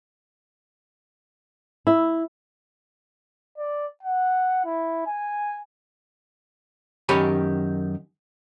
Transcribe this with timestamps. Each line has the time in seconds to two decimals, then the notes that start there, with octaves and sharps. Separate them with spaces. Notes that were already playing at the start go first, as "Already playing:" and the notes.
1.87 E4
3.58 D5
4.03 F#5
4.65 E4
5.07 G#5
7.09 F#2 D#3 G4 C#5 G#5 B5